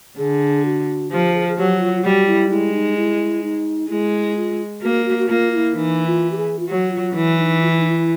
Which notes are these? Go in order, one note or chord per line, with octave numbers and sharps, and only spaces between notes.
D3 G#4
F#4
F3 G4
G#4
G#4
F#3 G4
F4
F4
G3 F#4
E4
G#3 E4
D#4
E4
D#4
G#3 E4
F4
A#3 F#4
F#4
F#4
A#3 F4
F4
E4
E3 D#4
F4
G4
G#4
F4
F#3 G4
F#4
F4
E3 E4
D#4
F4
E4
D#4
E4